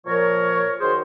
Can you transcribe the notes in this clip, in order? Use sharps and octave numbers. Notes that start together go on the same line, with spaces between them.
A#2 F3 A#4 C#5
D#3 F#3 G#4 C5